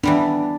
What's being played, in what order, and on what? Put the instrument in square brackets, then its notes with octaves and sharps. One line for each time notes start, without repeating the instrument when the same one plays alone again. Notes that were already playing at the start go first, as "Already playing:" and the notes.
[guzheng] E3 G3 B3 [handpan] D4